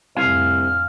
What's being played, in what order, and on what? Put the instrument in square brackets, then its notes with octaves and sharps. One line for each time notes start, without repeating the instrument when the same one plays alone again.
[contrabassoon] C2 [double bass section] F2 A2 D3 [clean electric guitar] F5 G#5 [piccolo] F6